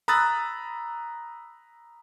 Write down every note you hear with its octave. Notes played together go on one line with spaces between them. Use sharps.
A#5 B5 D#6 E6 F#6 A6